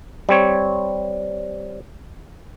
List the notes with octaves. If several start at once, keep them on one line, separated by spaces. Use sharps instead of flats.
G3 C4 C#5